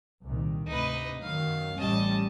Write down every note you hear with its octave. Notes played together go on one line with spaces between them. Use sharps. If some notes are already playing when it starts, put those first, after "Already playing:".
C2 A#2 D#3
D2 G#2 C3 D#4 B4
F#2 D#3 F#3 F5
A1 G3 C#4 D#5 A5